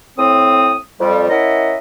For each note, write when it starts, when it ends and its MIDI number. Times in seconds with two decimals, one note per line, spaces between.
0.18 0.74 45
0.18 0.74 60
0.18 0.74 87
1.00 1.27 41
1.00 1.27 55
1.30 1.78 61
1.30 1.78 64
1.30 1.78 70
1.30 1.78 75
1.30 1.78 76
1.30 1.78 78